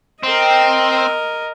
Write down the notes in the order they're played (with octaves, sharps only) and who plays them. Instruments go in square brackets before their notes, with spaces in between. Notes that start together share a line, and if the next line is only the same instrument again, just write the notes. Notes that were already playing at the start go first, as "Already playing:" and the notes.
[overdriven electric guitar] C4 [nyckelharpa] A#4 D#5